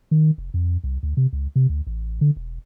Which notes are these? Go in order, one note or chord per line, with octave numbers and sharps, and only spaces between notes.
D#3
F1
F2
C2
D2
C3
C#2
C3
D2
A1
D3
E1